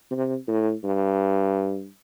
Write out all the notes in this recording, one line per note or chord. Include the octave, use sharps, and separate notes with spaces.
C3
A2
G2